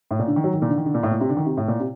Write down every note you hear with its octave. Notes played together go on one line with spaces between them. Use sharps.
A2
A#2
D3
D#3
F#3
D#3
A#2
D3
D#3
D3
A#2
A2
A#2
C3
D3
D#3
C3
A2
A#2
C3